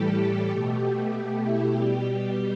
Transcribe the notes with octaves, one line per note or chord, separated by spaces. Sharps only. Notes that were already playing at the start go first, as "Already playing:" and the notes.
Already playing: A2 E3 G3 G4 A4
G4
B2 A3
E4
B2 G3 G4
G4